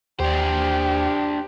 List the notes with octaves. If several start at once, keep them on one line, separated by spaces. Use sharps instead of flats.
D#2 D4 G4 C5